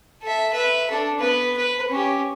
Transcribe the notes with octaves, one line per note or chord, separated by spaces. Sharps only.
A4 E5
B4 E5
D4 A4
B3 B4
B4
C#4 G4